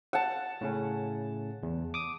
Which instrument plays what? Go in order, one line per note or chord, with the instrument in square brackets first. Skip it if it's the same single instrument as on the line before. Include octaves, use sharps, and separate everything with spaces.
[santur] F#5 A5
[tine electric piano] A2 C#3 C#4
E2
D6 D#6